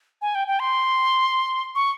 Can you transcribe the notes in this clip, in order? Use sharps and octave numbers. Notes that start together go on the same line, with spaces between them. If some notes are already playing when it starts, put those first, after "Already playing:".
G#5
G5
G5
C6
C#6